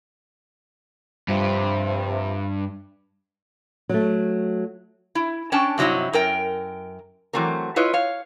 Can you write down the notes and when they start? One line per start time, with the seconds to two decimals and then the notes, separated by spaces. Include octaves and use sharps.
1.28 G2 C3 F3
3.89 F#3 A3
5.15 E4
5.52 C#4 D4 G5 A5
5.78 G2 C3 F#3 D#4 E4
6.13 F#2 A#4 G5
7.33 E3 F#3 A3 C4 A#4
7.76 E4 F4 B4 C#5 D#5
7.93 C#5 F5